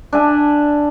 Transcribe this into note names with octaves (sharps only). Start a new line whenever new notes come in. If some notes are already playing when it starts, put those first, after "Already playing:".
D4 E5 G#5